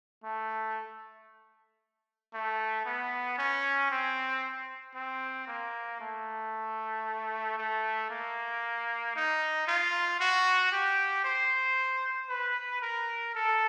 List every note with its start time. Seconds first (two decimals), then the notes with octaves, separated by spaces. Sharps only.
0.24 A3
2.34 A3
2.85 B3
3.38 C#4
3.91 C4
4.95 C4
5.47 A#3
6.00 A3
7.58 A3
8.10 A#3
9.16 D#4
9.67 F4
10.20 F#4
10.72 G4
11.24 C5
12.29 B4
12.82 A#4
13.35 A4